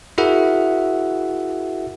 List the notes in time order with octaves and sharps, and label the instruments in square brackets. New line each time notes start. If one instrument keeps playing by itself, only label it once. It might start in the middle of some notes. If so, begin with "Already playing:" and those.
[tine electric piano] E4 F#4 G#4 A#4 E5 F#5